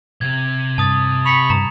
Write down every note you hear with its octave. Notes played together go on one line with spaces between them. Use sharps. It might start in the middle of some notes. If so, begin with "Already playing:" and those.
C3 G#6
G2 A5 D#6 A6
B5 C#6 B6 C#7 F7
G2 A#5